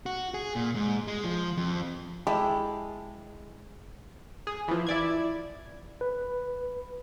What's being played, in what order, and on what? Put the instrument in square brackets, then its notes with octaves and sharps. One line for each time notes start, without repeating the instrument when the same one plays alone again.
[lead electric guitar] F#4
G#4
A#2
G#2
G#3
F3
F2
[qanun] G#3 [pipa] E4 G4 A4
[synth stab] G#4
E3 F3
E4 D5 G#6
[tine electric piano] B4